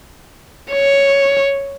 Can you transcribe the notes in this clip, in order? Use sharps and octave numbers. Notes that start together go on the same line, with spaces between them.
C#5